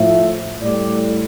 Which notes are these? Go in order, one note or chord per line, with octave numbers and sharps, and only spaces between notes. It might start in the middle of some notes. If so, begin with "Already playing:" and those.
Already playing: A2 F3 E5
A2 G3 D5